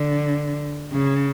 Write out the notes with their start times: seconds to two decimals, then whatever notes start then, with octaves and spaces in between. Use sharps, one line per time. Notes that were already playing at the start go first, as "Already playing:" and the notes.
Already playing: D3
0.93 C#3